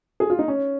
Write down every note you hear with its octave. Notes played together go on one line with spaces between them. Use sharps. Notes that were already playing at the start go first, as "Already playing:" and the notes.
G#4
F4
D#4
C#4